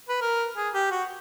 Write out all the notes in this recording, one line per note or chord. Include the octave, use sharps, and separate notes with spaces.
B4
A#4
G#4
G4
F#4